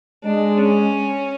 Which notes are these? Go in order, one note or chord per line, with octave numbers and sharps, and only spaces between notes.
G#3 D4
C#4